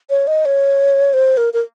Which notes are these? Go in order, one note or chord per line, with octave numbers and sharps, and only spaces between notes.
C#5
D#5
C#5
C5
A#4
A#4